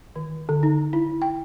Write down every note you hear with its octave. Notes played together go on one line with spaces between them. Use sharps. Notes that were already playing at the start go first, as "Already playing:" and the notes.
D#3
D3
D#4
E4
G5